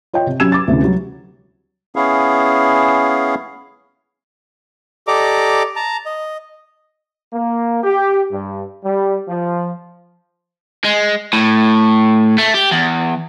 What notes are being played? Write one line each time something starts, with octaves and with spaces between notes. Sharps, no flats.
F4 C#5 D#5 G5
C3
F#3 C#4 G4 E6 G#6 E7
D6 A6
D2 C3 E3 C#4
F#3 G3
B3 C#4 E4 G#4 F5
G4 A4 D5 D#5 A#5 D6
A5 A#5
D#5
A#3
G4
G2
G3
F3
G#3
A2
A3
G4
E2